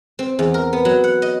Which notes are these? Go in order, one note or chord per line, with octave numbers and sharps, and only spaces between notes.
C4
E2
A#4
B3
F#3
F#5
D#5